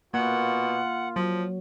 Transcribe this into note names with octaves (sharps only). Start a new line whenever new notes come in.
B2 A#3 F4 F#5
F3 F#3